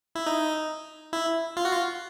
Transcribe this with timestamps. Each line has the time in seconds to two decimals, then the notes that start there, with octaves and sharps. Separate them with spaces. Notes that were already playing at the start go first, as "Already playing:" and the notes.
0.15 E4
0.26 D#4
1.13 E4
1.57 F4
1.65 F#4
1.72 F4